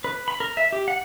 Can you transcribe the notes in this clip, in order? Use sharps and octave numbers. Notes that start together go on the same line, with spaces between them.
B4
B5
A#4
E5
G4
F#5